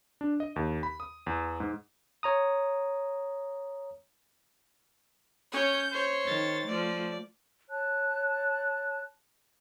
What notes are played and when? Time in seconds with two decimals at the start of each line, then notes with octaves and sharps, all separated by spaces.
0.21 D4
0.40 D#5
0.56 D#2
0.83 B5
1.00 D#6
1.27 E2
1.60 G#2
2.23 C#5 A#5 D#6
5.53 C#4 C#5 G6
5.91 C5 C#5
6.25 D#3 A6
6.67 F3 A3 D5
7.68 C#5 A5 F#6